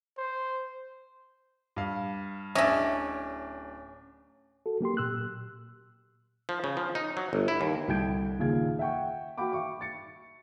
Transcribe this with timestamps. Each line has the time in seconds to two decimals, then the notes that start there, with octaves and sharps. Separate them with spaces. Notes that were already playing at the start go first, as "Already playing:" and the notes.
0.18 C5
1.76 G2 F5
2.55 D1 C#4 D4 D#5 E5 A#6
4.66 F#4 A4
4.81 F#3 A#3 G4 C6
4.97 A#2 E6 F#6
6.49 F3
6.64 C#3
6.77 F3
6.95 D#4
7.17 F#3
7.33 G1
7.48 E4
7.61 D#2
7.88 C2 D3 G5 G6 G#6 D7
8.39 D#2 A#2 C#3 F5 G#6
8.79 E5 F#5 G5 C#6
9.38 F#4 F5 G5 B5 D6
9.52 E5 C#6 D6
9.81 A6 C#7